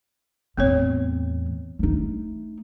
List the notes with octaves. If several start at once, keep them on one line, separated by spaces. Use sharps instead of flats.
E2 A2 B3 C4 C#5
A3 D#4